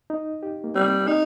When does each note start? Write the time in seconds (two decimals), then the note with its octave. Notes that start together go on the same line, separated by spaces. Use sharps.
0.10 D#4
0.43 G4
0.64 A#3
0.75 G3 C4
1.08 D#4